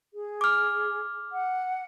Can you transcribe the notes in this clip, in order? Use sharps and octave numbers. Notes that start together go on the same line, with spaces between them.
G#4
D6 F6
F#5